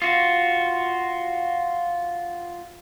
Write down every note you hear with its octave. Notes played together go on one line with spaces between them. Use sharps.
F4 F#4